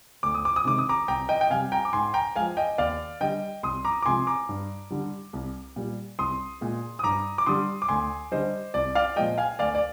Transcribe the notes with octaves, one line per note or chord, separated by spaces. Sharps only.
D2 D6
D#6
D6
D#6
C3 D#3 G#3 D6
D#6
A#5 D6
C2 G5 A#5
D#5 G5
G5
C3 G3 F5 G#5
G5 A#5
D6
G#2 G#5 C6
G5 A#5
F3 G#3 F5 G#5
D#5 G5
D#2 D5 F5
D3 G3 D#5 G5
C2 C6 D#6
A#5 D6
D6
C3 F3 G#3 G#5 C6
A#5 D6
G2
D3 G3
C2
A#2 G3
C2 C6 D#6
A#2 G#3
D#6
G2 A#5 D6
D6
D3 G3 C6 D#6
D6
D2 G#5 C6
D3 G3 C5 D#5
C2 D5
D5 F5
A#2 F3 G#3 D#5 G5
F5 G#5
D2 D5 F5
D5